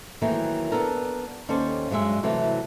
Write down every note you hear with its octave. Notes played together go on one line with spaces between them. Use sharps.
D#3 E3 F#3 A3 A#3
B3 D4 A4 A#4
D#2 C#4 A4 C5 D5
G2 B2 F#3 G#3 E5
C3 E3 F#3 A3